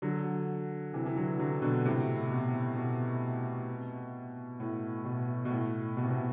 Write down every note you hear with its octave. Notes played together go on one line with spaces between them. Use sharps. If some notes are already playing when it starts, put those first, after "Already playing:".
D3 F#3
C3 E3
E3
D3 F#3
D3 F#3
B2 D3
A2 C3
B2
B2
A2
B2
B2
A2
B2
C3
B2